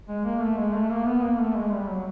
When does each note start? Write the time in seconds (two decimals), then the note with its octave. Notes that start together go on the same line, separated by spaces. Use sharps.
0.09 G#3
0.25 A#3
0.41 A3
0.57 G#3
0.74 A3
0.91 A#3
1.06 B3
1.22 A#3
1.39 A3
1.56 G#3
1.72 G3
1.89 F#3